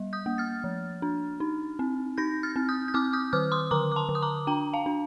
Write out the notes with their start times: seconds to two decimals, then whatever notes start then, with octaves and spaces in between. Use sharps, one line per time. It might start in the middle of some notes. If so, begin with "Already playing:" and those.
Already playing: G3
0.13 D#6 G6
0.26 A#3
0.38 F6 A6
0.64 F3
1.02 D4
1.40 D#4
1.79 C4
2.18 D#4 G6 A#6
2.43 F6 A6
2.56 C4
2.69 D#6 G6
2.88 G6
2.94 C4 D6 F6
3.13 D#6 G6
3.33 D#3 D6 F6
3.52 C6 D#6
3.71 D3 A#5 D6
3.92 D6
3.96 A5 C6
4.09 D3
4.15 D#6
4.22 A#5 D6
4.47 D4 G5 A#5
4.73 F5 A5
4.86 D4